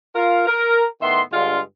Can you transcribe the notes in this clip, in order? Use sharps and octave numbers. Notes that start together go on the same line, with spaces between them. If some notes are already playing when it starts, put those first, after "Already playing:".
F4 A#4 F5
A#4
A2 D#3 B3 E5 C6
G2 D3 G#3 F4 F5 C6